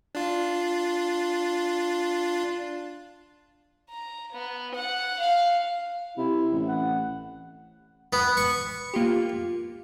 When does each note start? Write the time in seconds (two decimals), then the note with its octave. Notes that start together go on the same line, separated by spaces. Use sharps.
0.15 D4 F4
3.90 A#5
4.33 B3
4.75 F#5
5.20 F5
6.18 C3 E4
6.52 A1
6.68 F#5
8.13 B3
8.37 C#6
8.94 A#3 F4 G4